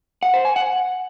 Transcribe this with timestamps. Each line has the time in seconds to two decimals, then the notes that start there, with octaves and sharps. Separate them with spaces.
0.23 F#5
0.34 C5
0.45 G#5
0.56 F#5